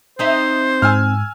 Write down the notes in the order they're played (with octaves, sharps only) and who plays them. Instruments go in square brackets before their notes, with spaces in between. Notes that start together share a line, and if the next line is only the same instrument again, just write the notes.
[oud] C4 D#4 E5 [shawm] C5
[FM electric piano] G#2 [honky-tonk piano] G#5 E6 F6